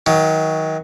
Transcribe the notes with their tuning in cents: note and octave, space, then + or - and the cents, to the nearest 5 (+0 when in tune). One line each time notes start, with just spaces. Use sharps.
D#3 +30 F#3 +0